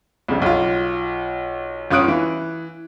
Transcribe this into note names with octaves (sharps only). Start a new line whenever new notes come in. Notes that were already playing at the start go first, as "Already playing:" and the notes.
C2 F2 C#3
B1 F4
G1 C#4 F4 D#6 F#6 D7
E3